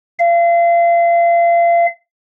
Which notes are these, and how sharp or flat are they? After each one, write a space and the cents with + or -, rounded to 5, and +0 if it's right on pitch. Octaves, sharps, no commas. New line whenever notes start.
F5 -35